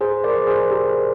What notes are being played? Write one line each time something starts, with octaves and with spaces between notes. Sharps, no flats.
G#4 C5
A#4 D5
G#4 C5
G4 A#4